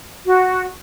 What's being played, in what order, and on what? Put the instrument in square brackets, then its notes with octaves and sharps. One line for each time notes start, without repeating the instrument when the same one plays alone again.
[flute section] F#4